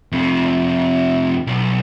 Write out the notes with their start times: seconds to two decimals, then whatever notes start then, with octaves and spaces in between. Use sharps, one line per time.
0.12 F2 C3
1.47 B1